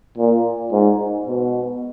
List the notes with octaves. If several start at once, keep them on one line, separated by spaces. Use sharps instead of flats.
A#2
G#2
B2